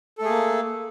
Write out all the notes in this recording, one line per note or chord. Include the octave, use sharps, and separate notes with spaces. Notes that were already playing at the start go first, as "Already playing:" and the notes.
A3 A#3 G#4 A4